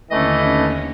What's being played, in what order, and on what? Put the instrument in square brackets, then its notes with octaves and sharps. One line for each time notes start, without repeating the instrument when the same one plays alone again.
[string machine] D#2 D3 C#4 [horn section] E3 A3 [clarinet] D#5